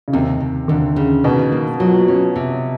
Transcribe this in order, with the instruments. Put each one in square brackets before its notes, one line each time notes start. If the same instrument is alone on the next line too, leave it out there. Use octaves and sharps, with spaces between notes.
[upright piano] C#3
[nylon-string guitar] D#2 [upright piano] C3
[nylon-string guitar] D#2
[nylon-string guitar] D#2 [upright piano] D3
[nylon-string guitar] C#3
[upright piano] B2 [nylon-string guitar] D#3
[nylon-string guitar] A#3
[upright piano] F3 [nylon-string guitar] F#3
[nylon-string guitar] C#4
C3